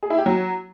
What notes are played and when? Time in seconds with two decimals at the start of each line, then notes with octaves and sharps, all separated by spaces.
0.03 G#4
0.10 E4
0.18 G4
0.26 F#3